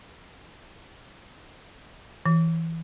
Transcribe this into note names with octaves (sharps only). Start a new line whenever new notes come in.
E3